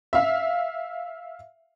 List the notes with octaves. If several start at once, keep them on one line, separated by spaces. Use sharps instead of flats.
E5 F5